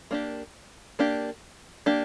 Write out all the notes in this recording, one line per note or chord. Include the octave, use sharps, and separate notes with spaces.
A#3 D4 G4
A#3 D4 G4
A#3 D4 G4